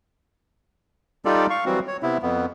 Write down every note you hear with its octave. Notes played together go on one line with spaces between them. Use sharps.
G3 D#4 F4 G4 A4 D5
F5 C#6
E3 F#3 G3 C4 F#4
C#5
C3 B3 E4
F2 B3